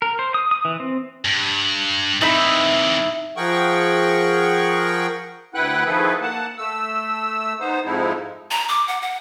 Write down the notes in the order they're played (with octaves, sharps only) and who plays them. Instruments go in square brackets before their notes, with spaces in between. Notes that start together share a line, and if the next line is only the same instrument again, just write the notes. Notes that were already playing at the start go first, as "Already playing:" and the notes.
[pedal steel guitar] A#4
C5
D#6
D#6
E3
C4
[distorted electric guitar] G2
[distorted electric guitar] C3 E3 [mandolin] D#4 E4 E5
[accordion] F3 G#4 A#4 F#5 G5 C#6
D2 E4 B4 F#5 G5 F#6
D#3 F3 E4 G#4 A4 B4
A#3 F#5 A5
A3 E6
B3 D#4 C5
F2 G#2 F3 G#3 D#4 E4
[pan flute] A#5
D6
F#5
F#5